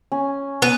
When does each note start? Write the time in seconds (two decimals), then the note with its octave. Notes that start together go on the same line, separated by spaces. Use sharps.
0.12 C#4
0.62 B3